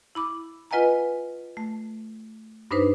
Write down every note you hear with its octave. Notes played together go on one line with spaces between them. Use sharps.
E4 B5 D6
F4 B4 D#5 F#5 G#5 A#5
A3
G2 D4 D#4 B4 C5